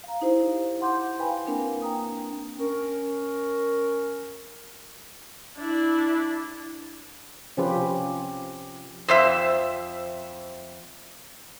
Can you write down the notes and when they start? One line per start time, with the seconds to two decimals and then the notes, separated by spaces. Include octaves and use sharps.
0.04 F5 A#5
0.21 D#4 E4 G4 C5
0.81 F#5 C6 D6 G6
1.19 B4 F5 G5 G#5 B5
1.47 A#3 C4 D4 A#4
1.82 G5 A#5 D#6
2.59 C#4 A#4
5.58 D4 E4
7.57 C3 F3 C#4 F4 G4 B4
9.08 F2 C5 E5